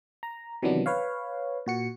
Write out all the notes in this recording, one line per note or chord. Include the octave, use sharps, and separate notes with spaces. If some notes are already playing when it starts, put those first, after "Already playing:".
A#5
C3 D#3 E3 F#3 B3 D4
B4 C#5 F5
A#2 F#4 C#7